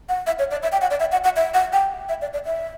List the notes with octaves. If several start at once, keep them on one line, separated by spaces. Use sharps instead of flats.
F#5
E5
C#5
D5
E5
G5
F#5
D5
E5
F#5
F#5
E5
F#5
G5
E5
D5
D5
E5